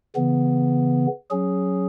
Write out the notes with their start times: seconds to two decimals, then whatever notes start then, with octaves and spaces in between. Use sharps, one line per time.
0.16 C#3 E3 B3
1.31 F#3 C#4 G#4